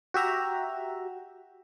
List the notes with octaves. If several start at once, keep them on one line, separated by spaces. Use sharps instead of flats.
F#4 G4 E5 A#5